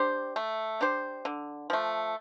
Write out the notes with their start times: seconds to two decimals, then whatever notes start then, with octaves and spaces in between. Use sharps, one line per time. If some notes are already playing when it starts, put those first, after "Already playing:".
Already playing: D4 G4 C5
0.36 A3
0.81 D4 G4 C5
1.25 D3
1.70 F3 A3